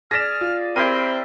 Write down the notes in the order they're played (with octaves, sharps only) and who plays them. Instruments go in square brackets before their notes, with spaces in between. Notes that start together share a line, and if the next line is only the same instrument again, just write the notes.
[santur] G#4 D5 [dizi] F6 [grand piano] A#6 B6 E7
[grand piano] F4
[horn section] C4 [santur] E4 G4 A#4 [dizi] B5 [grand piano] D#7